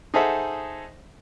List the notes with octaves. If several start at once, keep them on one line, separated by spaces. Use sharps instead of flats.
D#4 G#4 A4 C5 E5 F#5